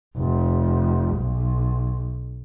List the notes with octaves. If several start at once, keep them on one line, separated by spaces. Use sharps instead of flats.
F1
B1